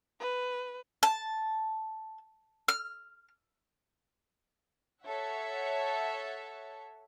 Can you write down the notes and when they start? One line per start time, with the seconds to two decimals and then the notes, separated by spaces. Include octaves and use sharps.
0.20 B4
1.03 A5
2.68 F6
5.03 A4 C#5 E5 F#5